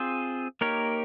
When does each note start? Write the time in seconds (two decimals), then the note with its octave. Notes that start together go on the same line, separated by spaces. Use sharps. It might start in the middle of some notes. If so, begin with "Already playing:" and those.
Already playing: C4 F4 G#4 C5
0.61 A#3 D#4 G4 A#4 C#5